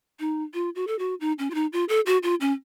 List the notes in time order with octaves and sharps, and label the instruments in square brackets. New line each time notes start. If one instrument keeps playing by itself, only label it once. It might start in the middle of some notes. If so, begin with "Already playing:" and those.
[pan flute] D#4
F4
F#4
A4
F#4
D#4
C#4
F4
D#4
F4
A4
F#4
F4
C#4